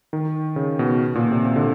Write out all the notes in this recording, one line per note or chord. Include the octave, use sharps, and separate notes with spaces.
D#3
C#3
B2
A#2
C3
C3
D3